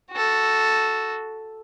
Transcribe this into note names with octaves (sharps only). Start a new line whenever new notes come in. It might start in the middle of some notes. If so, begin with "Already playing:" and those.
F#4 A4